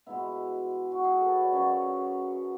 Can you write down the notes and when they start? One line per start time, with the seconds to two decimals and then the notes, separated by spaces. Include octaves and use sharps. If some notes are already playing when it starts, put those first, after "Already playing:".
0.06 B2 G#3 B3 E4
0.92 F#4
1.04 G#4
1.16 A4
1.25 B4
1.33 C#5
1.42 D5
1.52 F#2 C#3 F#3 C#4 C#5
1.71 C#5
1.88 F#4